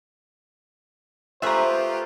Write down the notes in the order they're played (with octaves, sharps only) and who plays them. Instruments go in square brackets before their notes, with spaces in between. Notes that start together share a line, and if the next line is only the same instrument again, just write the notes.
[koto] A3 G#4 B4 [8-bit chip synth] F4 G4 [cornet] C5 [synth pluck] E5 A#5